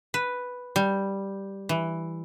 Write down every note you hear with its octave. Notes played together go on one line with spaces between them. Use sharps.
B4
G3
E3